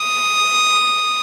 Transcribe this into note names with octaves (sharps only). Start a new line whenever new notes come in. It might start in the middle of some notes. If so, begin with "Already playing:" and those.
Already playing: D#6